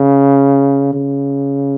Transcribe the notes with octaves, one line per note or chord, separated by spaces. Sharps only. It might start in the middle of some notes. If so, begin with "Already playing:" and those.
Already playing: C#3
C#3